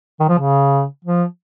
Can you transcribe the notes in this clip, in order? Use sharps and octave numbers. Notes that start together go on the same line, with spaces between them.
D#3
F3
C#3
F3